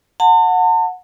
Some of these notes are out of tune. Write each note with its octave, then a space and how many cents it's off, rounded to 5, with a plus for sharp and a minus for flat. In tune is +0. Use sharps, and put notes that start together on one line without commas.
F#5 -15 A5 +40